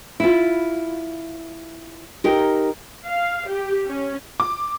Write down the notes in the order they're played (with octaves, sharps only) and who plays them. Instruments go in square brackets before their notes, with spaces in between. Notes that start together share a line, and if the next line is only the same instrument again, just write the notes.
[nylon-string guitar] E4 F4
D#4 G4 A#4
[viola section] F5
G4
C#4
[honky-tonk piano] D6